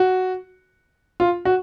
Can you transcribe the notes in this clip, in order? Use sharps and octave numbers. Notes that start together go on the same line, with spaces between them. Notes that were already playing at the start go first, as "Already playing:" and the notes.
Already playing: F#4
F4
F#4